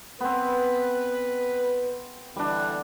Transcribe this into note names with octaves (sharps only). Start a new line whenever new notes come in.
B3 C4 B4
D3 E3 G3 D4